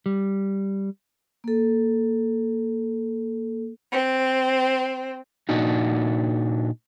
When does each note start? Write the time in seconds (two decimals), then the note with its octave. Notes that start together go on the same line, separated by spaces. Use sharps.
0.06 G3
1.44 A#3 A4
3.92 C4
5.49 A#2 D4 D#4 F#4